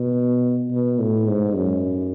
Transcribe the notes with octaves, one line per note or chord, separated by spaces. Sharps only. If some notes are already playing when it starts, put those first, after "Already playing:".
Already playing: B2
B2
A2
G#2
F#2